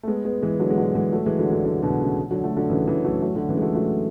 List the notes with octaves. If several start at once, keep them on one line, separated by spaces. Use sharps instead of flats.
A3
G#3 B3
G#3 B3
E3 G#3
D3 F#3
G#3
D3 F#3
E3 G#3
F#3 A3
E3 G#3
D3 F#3
D3 F#3
D3 F#3
B2 D3
C#3
D3 F#3
F#3 A3
D3 F#3
C#3 E3
C#3 E3
F#3 A3
F#3 A3
D3 F#3
C#3 E3
G#3
F#3 A3
F#3 A3